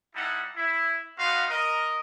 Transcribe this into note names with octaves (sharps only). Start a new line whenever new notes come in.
G3 D#4 E4 F#5 A5
E4
B3 D#4 F#4 F5 C6
A#4 D#5